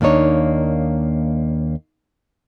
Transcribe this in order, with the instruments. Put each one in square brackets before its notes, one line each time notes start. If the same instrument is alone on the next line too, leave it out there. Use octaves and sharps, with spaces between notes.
[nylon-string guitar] D#2 A#3 D4 D#4 C#5